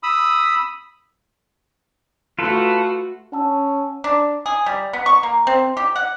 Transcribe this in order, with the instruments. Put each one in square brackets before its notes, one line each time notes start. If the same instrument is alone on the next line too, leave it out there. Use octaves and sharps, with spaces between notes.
[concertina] B5 D#6 E6
[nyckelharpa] A3 F#4 [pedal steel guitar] F4 A4 B4
[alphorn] C#4 [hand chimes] F#5 A5 E6
[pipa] D4
G#4
G3
B3
C#6
A#3
C4
G4
F#5